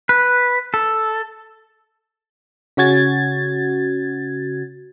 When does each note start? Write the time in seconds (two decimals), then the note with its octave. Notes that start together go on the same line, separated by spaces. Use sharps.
0.09 B4
0.74 A4
2.77 C#3 C#4 F#4 G#6 A6